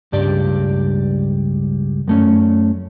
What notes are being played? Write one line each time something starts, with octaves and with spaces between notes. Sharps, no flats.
C#2 G2 G4 D5
F#2 A3 C#4